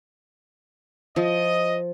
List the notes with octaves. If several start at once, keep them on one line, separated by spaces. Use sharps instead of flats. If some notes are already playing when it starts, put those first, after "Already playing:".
F3 D#5